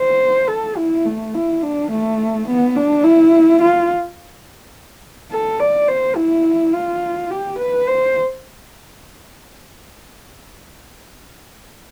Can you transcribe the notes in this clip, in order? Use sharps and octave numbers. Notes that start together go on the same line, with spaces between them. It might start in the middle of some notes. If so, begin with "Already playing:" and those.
Already playing: C5
A4
E4
A3
E4
D4
A3
B3
D4
E4
F4
A4
D5
C5
E4
F4
G4
B4
C5